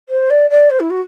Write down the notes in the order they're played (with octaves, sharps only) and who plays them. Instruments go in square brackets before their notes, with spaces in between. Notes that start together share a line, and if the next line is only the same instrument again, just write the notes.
[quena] C5
D5
D5
C5
E4
F#4